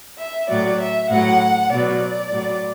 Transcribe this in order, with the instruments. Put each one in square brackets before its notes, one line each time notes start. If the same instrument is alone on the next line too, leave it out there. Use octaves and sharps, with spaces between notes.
[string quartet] E5
A2 F#3 D5
E5
A2 F#3 F#5
B2 F#3 D5
A2 F#3